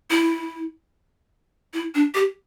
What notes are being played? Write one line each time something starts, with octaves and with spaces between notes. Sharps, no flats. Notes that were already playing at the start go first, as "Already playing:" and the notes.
E4
E4
D4
G4